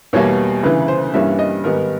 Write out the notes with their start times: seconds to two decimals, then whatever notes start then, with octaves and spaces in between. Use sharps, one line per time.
0.13 E2 B2 G3 A#3 C#5
0.63 D2 C#3 E3 B4
0.88 C5
1.14 G2 E3 G3 A#3 C#4 E5
1.39 D#5
1.64 G#2 D#3 G3 B3 A#4